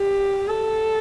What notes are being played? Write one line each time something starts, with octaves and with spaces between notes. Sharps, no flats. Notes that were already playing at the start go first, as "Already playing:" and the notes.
Already playing: G4
A4